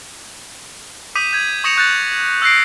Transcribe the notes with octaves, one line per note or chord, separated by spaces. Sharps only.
D6 D#6 G6 B6 D#7 F7
G6 G#6
C#6 D#6 A#6 C#7 E7 F7
C#6 F#6 G6 A6
E6 F#6 A#6 C7 D7